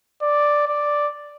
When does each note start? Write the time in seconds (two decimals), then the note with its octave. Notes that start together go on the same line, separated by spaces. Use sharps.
0.22 D5
0.67 D5